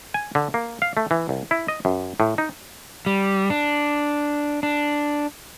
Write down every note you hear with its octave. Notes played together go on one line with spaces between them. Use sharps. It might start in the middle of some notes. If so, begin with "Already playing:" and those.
G#5
D3
A#3
F5
A3
E3
C2
E4
D#5
F#2
A2
D#4
G3
D4
D4